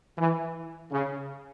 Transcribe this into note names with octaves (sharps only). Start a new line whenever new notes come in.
E3
C#3